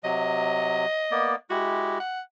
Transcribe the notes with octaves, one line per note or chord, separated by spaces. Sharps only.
C3 F#3 D#5
A#3 B3 D5
G#3 E4 F#4 G4
F#5